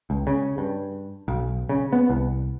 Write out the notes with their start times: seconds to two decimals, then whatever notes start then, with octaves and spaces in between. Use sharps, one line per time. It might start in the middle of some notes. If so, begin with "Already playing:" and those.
0.10 C#2
0.27 C#3
0.58 G2
1.28 B1
1.69 C#3
1.93 B3
2.09 C2